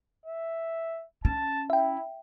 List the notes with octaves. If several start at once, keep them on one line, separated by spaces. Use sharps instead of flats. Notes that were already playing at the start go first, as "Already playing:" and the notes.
E5
C#4 A5
E4 E5 G5